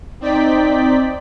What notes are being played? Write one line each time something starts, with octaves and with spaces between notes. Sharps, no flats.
C4 D#4 D5 G5 B6